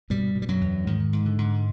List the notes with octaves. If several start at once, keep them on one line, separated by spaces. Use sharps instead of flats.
G2 B2 G3
B2
G3
F#2 F#3
E2
G#2 D#3
G#2
D3
G#2